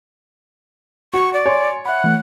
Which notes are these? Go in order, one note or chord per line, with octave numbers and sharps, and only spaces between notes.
F#4 C#6
D5
C#5 G#5 C6
E5 F#5 B5
E3 A3